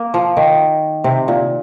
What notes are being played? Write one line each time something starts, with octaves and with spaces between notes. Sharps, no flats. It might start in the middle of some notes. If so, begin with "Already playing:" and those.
Already playing: A#3
F3
D#3
C3
A#2